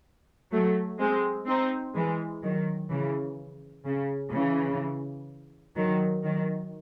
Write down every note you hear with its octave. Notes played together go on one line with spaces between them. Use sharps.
F#3 A3
G#3 C4
C4 D#4
E3 G#3
D#3 F#3
C#3 E3
C#3
C#3 E3
D#3 F#3
D#3 F#3